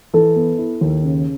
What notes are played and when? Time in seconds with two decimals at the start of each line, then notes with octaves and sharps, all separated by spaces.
0.13 E3 A4
0.36 B3
0.58 E4
0.81 D#2
1.03 C#3